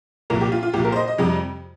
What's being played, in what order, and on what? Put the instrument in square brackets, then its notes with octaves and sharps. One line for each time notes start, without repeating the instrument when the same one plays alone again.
[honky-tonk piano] C2 A#2 F3 A#4
G4
F4
F4
C2 A#2 F3 G4
A#4
C5
D#5
D#5
F2 C3 G3